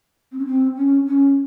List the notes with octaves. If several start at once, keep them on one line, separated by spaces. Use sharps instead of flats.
C4
C#4
C4
C#4
C#4